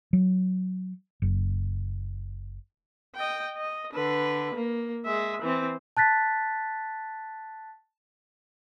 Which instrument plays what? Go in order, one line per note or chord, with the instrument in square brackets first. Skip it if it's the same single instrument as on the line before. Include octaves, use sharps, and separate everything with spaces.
[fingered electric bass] F#3
F#1
[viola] D#5 G5
D#5
D3 B4
A#3
G#3 E5
E3 C4
[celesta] A5 F#6 A6 B6